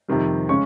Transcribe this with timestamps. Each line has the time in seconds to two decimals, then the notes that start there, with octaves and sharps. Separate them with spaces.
0.08 F2 C3 D#3 G3
0.49 C#3 G#3 C#4 C#6